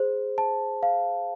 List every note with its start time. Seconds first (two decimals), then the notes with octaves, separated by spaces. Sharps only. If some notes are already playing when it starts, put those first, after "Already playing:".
Already playing: G#4 C5
0.38 A5
0.83 F5